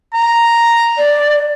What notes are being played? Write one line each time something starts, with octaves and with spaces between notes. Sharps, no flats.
A#5
D5